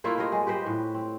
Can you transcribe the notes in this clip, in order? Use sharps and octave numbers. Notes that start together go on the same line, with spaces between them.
A3 A#3 E4 F4
F4 G4 C#5 D#5
G#3
G4 B4 C5 D#5
A2
C4